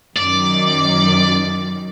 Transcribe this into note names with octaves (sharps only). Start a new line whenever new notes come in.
F#2 D#3 D5